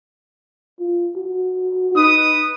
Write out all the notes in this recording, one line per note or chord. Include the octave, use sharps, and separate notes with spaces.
F4
F#4
D#4 B4 D#6